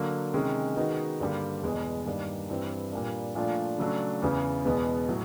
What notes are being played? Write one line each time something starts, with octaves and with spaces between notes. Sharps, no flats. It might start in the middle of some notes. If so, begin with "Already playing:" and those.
Already playing: D3 F#3 A#3
C3 D#3 G#3 C#4
D#3 G#3 B3 D#4 F#4
G2 D3 G3 A#3
E2 B2 G#3 B3
G2 D#3 G3 A#3 D4
G2 E3 G3 C4 E4
A#2 G3 A#3 D4
A#2 F3 A3 D4 F4
C#3 F#3 A3 D4
E2 C#3 E3
E2 B2 G#3 B3
A2 F#3